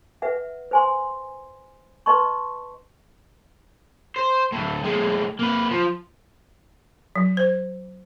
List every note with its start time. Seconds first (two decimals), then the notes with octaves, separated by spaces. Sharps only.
0.22 B4 E5 F#5
0.71 C5 G#5 C6
2.06 B4 D#5 A5 C6 C#6
4.16 C5
4.52 D2 A2
4.84 A2 G#3
5.39 A#3 B4
5.71 F3
7.16 F#3
7.37 C5